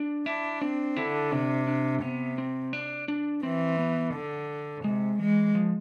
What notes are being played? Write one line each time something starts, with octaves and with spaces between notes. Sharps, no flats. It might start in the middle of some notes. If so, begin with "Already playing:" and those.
Already playing: D4
D4 E4
C4 D4
D3 E4
C3 D4
D4
C3 B3
C4
D4
D4
E3 C4
B3
D3
C3 G#3
E3 G#3
F3